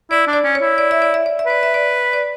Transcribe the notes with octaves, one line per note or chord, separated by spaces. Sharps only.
E4 D5
D4
D5
C#4
C#5
E4
D5
E5
D5
E5
D5
E5
B4 D5
E5
D5
D5